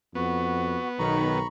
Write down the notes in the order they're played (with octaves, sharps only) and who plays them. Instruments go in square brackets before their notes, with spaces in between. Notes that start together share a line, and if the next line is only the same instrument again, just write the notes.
[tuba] F2 [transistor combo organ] B3 [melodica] F#4
[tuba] B1 [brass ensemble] D#3 [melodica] A#5 B5 C#6